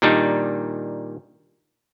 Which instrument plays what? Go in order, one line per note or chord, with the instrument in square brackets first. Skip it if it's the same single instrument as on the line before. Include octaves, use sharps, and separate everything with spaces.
[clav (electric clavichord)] A#2 D#3 G3 D4 D#4